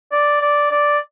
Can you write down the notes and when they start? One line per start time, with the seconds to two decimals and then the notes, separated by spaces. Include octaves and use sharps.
0.12 D5
0.42 D5
0.71 D5